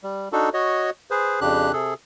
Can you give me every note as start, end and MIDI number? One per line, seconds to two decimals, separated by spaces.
0.04 0.29 55
0.33 0.50 62
0.33 0.50 63
0.33 0.50 66
0.33 0.50 69
0.54 0.90 66
0.54 0.90 73
0.54 0.90 75
1.11 1.40 68
1.11 1.40 71
1.11 1.40 72
1.41 1.72 41
1.41 1.72 49
1.41 1.72 62
1.41 1.72 67
1.41 1.72 90
1.73 1.94 48
1.73 1.94 68
1.73 1.94 69